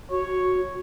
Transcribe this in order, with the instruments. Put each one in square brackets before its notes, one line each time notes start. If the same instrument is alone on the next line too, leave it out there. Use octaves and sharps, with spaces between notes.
[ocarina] F#4 [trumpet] C#5